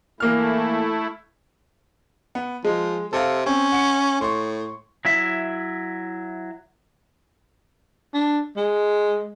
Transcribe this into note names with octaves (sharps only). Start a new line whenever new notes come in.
E3 A3 A#3 E4 F6
B3
F3 G#3
C3 A4 F5
C4 C#4
F#5 C#7
A2 C6 C#6
F#3 E4 E5
D4
G#3